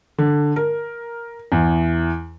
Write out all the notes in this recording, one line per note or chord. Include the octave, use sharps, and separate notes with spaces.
D3
A#4
E2